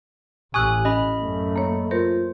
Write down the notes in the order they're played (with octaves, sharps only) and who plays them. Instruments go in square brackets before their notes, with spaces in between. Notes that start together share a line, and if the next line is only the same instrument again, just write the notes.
[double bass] A1 [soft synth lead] G4 [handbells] G#5 D#6 F#6 [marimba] C#6 E6
[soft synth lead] C#4 [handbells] D#5 B5
[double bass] F#2 A3
[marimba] A#3 C#5
[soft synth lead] F4 [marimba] A#4 [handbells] C5